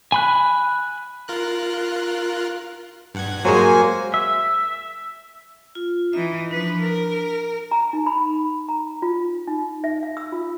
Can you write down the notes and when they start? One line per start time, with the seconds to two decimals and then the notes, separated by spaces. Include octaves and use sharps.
0.12 G#5 B5 F#6
1.28 F4 A#4 F#6
3.14 G2 F#5 G#6
3.45 F#3 G#3 A#3 C5 G#5
4.14 E5
5.75 F4
6.13 E3 D#4 E5
6.51 F3 D4 B4
6.81 A#4
7.71 A#5
7.93 D#4
8.07 B5
8.69 A#5
9.02 F4
9.47 D#4
9.84 E5
10.03 F5
10.17 E6
10.32 F4